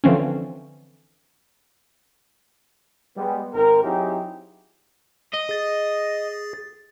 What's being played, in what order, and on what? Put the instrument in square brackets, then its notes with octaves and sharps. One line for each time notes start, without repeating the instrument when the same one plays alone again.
[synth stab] D3 E3 F3 C4 C#4
[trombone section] G3 G#3 B3
G#1 D#3 C4 A#4
F#3 C4 D#4 E4 G4 G#4
[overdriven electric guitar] D#5
[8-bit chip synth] G#4 A6